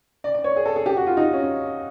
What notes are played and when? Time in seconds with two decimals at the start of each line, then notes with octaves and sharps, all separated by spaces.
0.24 D5
0.34 D5
0.44 C#5
0.56 G#4
0.66 A4
0.76 G#4
0.86 G4
0.97 F#4
1.07 F4
1.17 D#4
1.33 C#4